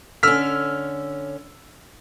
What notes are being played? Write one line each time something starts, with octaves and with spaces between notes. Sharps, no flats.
D3 C#4 E6 F6 B6